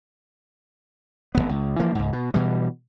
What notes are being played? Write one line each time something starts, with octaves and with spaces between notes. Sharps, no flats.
G#1 F2 B3
C#2
E3 F3 A#3
C#2 G#2
B2
B2 E3 G3